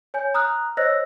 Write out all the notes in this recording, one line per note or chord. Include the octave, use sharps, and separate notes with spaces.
C#5 G#5 G6
A#5 D#6 F6 F#6
C5 C#5 D#5 E6 F#6 A#6